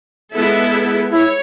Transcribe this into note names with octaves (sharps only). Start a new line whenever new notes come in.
G#3 B3 E4 A4
E4 C#5